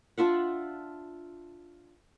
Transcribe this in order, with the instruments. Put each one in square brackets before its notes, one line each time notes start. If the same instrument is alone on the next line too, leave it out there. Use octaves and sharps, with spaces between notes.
[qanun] D4 F4 E5 F#5